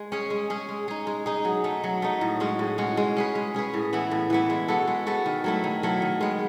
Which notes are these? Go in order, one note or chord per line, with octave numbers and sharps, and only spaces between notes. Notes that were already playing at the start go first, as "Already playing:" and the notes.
Already playing: G#3
C#4 G#4
G#3
C#4 G#4
G#3
D#4 G#4
G#3
D#4 G#4
F#3
A3 D#4
F#3
A3 D#4
A2
G#3 C#4 F#4
A2
G#3 C#4 F#4
G#3
C#4 G#4 B4
G#3
C#4 G#4 B4
A2
E3 B3 E4
A2
E3 B3 E4
G#3
B3 F#4 A4
G#3
B3 F#4 A4
D#3
F#3 A3 E4
D#3
F#3 A3 E4
D#3
G#3 B3